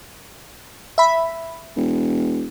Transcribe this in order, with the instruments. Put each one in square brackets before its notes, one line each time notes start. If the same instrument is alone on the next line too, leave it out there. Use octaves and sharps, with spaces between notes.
[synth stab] E5 B5
[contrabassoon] E1